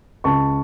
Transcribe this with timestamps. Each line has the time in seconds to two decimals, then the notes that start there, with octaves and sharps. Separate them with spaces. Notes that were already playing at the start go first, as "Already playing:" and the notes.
0.24 C#2 A5 C#6